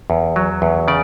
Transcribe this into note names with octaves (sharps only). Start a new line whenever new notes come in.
E2
F#3
E2
C#3 D5